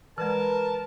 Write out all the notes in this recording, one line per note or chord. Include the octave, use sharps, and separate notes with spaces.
E3 G#3 A#4 B4 A5